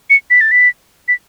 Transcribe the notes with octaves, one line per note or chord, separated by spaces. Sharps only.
C#7
B6
A6
B6
B6